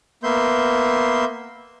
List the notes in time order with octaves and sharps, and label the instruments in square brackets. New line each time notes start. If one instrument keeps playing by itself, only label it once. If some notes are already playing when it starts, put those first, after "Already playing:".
[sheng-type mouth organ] A#3 B3 E5 C6 G6